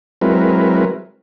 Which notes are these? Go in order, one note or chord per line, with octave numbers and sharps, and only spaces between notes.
F#3 G#3 C4 E4 A#4 B4